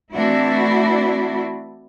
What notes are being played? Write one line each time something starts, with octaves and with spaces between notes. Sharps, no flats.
E3 A3 C4 D4 E4 F#4